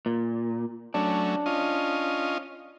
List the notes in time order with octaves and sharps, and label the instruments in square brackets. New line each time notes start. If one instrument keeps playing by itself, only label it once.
[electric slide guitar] A#2
[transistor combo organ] F#3 A3 C#4 [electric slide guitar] D4
[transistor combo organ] C#4 F4 D#5